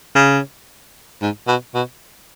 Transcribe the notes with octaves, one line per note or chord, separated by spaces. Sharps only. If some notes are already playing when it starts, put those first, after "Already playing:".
C#3
G#2
B2
B2